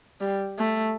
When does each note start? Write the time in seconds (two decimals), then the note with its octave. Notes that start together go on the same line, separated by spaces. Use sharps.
0.21 G3
0.59 A3